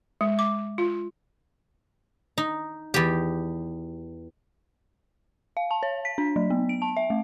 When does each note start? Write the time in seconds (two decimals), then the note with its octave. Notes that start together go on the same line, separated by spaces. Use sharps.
0.21 G#3
0.39 D6
0.78 F4
2.38 D#4
2.94 E2 G4
5.57 F5
5.71 A5
5.83 C#5
6.05 B6
6.18 D4
6.36 F#3
6.50 B3
6.69 D7
6.82 A5
6.97 E5
7.10 A3